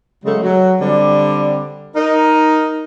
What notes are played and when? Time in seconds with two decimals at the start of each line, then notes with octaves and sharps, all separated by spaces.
0.25 C#3 F#3 G#3 A3
0.43 F#3
0.80 D3 G3 C4 D5
1.95 D#4 A#4